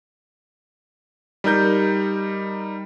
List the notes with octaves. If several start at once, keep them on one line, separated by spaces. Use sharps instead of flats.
G3 D#4 A#4 G6